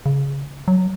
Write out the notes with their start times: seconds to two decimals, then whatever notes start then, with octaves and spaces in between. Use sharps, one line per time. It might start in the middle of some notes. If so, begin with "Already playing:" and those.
0.06 C#3
0.68 F#3